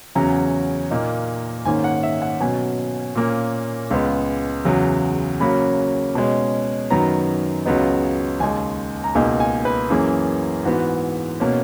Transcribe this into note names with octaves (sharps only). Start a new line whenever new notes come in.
E2 C#3 F#3 C#4 A#5
A#2 A#3 D#4
G#2 D#3 A#3 C#4 G#5
F#5
E5
F#5
B2 F#3 C#4 G#5
A#2 A#3 C#4
C#2 C#3 G#3 B3
E2 C#3 F#3
C#3 F#3 A#3 C#4 B5
B2 G#3 C#4
F#2 D#3 F#3 B3 A#5
C#2 C#3 F#3 B3 D#4
D#2 C#3 G#3 G#5
A#5
C#2 B2 A#3 D#4 G#5
G#5
B4
F#2 E3 A#3 C#4 G#4
G#2 E3 B3 F#4
B2 A#3 C#4